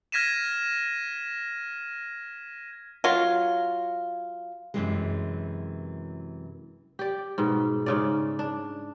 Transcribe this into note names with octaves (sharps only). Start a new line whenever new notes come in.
F6 G#6 A#6 B6 D#7 E7
F#3 F4
F#2 A2 C3 E3 F#3 G#3
G4 D5
G#2 B2
G#2 C#3 D5
D4